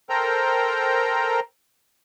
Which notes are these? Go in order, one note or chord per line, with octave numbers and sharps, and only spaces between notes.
A4 A#4 C5 G5 A#5